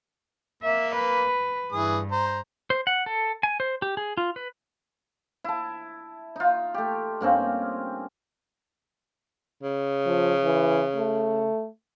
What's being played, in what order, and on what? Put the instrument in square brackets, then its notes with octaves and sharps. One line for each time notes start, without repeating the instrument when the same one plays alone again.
[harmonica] A#3 [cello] E5
[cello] B4
[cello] G2 [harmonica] E3 G#4 D#6
[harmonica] C5 A#5
[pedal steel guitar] C5
F#5
A4
G#5
C5
G4
G#4
F4
B4
[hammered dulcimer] E4 A5
D#4 F4
A3 G4
G2 A#3 C4 C#4
[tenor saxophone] C#3
[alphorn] F3
E3
A3